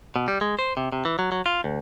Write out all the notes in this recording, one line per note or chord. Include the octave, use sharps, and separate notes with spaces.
B2
G3
G#3
C5
C3
C3
E3
F#3
F#3
F4
D2